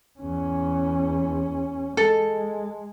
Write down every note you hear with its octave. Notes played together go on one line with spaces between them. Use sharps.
E2 C#4
G#3 A4